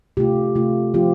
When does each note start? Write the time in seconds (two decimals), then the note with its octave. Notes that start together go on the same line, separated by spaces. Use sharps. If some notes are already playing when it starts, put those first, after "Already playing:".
0.17 C3 A3 F4 G4
0.55 C3 A3 F4
0.94 F3 C4 F4 G4